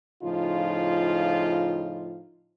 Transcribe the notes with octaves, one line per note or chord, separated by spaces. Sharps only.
A2 C#3 F3 D#4 F4